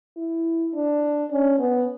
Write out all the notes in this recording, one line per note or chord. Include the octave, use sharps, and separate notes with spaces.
E4
D4
C#4
B3